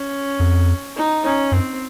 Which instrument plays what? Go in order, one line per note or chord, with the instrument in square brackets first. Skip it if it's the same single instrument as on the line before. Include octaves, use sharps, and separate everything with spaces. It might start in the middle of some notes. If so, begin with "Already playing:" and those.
Already playing: [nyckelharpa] C#4
[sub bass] F2
[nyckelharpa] D#4
C#4
[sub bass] F#2 [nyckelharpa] C4